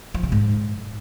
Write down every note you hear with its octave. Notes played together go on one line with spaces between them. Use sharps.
F3
C3
G#2